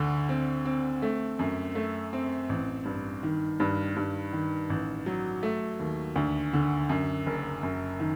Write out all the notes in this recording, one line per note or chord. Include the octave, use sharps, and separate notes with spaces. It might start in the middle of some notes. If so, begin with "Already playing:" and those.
Already playing: D2 D3
C4
C4
A3
F#2
A3
C4
A1
G2
D#3
G2
G2
D#3
A1
F#3
A3
D#2
D2
D3
F#2
F#1
F#2
D#3